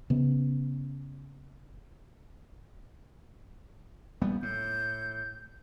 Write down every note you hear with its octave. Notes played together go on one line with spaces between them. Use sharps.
C#3 B3
A#1 G3 B3
A2 G6